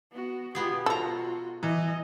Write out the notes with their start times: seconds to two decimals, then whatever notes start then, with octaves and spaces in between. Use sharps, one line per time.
0.11 B3 F#4
0.55 B2 B3 F4 G4 G#4
0.86 B2 F4 F#4 A4 A#5
1.63 E3 D#5